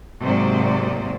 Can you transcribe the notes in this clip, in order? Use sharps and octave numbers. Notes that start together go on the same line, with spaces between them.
G#2 C3 F#3 A#3 C5 D5